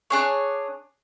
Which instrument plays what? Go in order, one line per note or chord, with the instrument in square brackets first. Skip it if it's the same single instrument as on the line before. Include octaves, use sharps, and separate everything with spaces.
[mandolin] D4 G#4 C#5